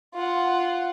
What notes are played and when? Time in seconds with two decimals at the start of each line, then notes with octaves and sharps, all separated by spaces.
0.14 F4 F#5